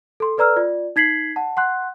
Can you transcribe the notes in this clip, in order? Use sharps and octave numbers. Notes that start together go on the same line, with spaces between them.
A4 C6
A4 B4 D5 A#5 E6 F6
F4 D5
D#4 G#6 B6 C7 F#7
F#5 A5
F#5 C6 F#6